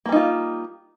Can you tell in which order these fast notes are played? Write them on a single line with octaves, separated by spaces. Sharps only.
A#3 G3 D#4 F4